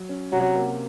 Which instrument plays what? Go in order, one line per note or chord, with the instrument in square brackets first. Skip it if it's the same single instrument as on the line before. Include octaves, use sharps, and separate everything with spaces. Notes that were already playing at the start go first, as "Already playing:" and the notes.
Already playing: [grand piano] F#3
C#4
[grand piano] C3 [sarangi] F#3
[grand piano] A#3